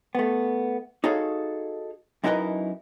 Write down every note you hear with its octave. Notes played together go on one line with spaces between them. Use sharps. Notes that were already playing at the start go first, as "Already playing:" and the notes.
A3 B3
D#4 F#4 G#4 A4 C#5 F5
F#2 D#4 E4 A#4 B4 D#5